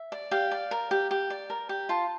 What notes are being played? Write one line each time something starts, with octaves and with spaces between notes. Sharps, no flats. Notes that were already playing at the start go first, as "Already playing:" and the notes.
Already playing: E5
D5
G4 F5
D5
A#4
G4
G4
D5
A#4
G4
F4 A5